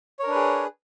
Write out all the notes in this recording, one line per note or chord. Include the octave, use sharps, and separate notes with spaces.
D4 G#4 A#4 B4 C#5